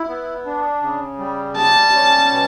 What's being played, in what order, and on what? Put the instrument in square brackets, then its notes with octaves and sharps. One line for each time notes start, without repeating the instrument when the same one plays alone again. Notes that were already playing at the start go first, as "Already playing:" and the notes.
Already playing: [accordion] E4
B3
D4
C#3
G3
[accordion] G3 [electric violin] A5
[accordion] C#4
B2